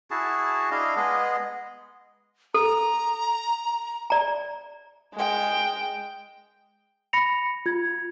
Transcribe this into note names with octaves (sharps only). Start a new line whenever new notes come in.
E4 F#4 G#4 A5
D4 E4 D#5 F5
G#3 B3 G#4 D#5
A4 A#5
D5 A#5
G#3 G5
B5 A#6 C#7 F7
F4 G#6